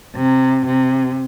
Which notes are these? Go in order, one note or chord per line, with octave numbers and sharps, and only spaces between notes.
C3
C3